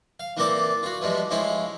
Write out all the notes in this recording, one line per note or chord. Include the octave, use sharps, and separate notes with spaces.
F5
E3 A#3 C4 A4 D5
F4 F#4
E3 F3 G3 G#3
F3 G#3 C#4 E4 F4